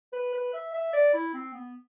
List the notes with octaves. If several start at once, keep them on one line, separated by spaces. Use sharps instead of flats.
B4
B4
E5
E5
D5
E4
C4
B3